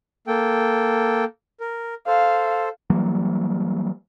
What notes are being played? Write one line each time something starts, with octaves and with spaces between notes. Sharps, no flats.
A#3 A4 G5
A#4
A4 C5 F5
E3 F#3 G3 A#3